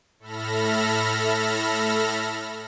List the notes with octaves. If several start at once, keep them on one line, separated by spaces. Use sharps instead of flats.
A2 A4 E5 B5 F6 A#6